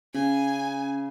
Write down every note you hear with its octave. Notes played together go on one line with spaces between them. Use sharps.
C#3 C#4 G#5